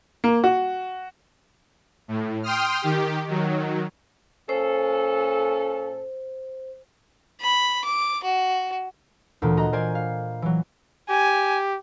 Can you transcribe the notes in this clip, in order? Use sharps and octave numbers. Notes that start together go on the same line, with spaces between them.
A#3
F#4
A2
G5 C6 D#6 F6
D#3 G4
D#3 F#3
A#2 C#4 A4 C5
B5
D6
F#4
D2 A#2 E3
F#4 D#5 A#5
A#4 C5 D5 G#5
F5
E3 F#3
G4 G#5